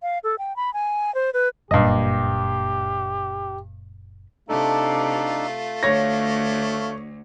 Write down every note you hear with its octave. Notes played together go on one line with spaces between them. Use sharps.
F5
A4
G5
B5
G#5
C5
B4
F#1 G2 A#2 G4 D#5
C3 A3 D4 D#4 F4 A4
D2 C#5 F5 A#6